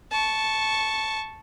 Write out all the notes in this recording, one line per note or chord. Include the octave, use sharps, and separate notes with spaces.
A5 C#6